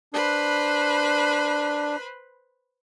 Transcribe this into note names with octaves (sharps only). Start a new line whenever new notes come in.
D4 B4 C5 B5